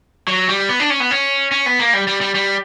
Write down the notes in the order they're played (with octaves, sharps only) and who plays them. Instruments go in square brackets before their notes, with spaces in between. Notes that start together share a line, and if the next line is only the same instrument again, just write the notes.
[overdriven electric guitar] F#3
G3
B3
D4
C#4
B3
C#4
C#4
B3
A#3
G3
G3
G3
G3